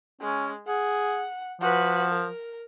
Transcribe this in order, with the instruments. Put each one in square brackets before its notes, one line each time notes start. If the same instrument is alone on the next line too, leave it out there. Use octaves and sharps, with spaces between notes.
[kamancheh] G#3 [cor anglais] C#4
[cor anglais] G#4 [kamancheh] F#5
[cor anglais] F3 [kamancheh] F#4 B4
[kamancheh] A#4